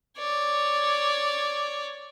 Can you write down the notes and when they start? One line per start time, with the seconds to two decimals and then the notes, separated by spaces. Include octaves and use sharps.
0.18 C#5 D5